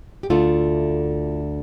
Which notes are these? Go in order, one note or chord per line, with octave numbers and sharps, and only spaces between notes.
G4
D2 D3 A3 F4